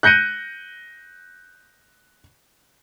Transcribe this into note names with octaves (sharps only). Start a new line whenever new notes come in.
F#6 G6 A#6 C#7 D#7